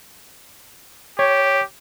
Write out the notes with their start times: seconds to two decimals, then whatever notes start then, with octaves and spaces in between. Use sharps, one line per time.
1.19 G4 C#5